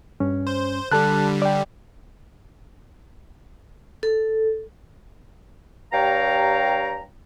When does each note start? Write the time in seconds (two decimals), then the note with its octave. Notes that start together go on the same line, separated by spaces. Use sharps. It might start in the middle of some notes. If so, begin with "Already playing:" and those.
0.20 G2 C#4
0.47 C5
0.91 D3 G3 A4 A5 F#6
1.42 D5 G5
4.03 A4
5.93 G2 G4 C#5 F5 G5 A#5